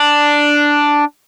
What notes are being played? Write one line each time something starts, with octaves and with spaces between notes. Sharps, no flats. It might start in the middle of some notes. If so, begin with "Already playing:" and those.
Already playing: D4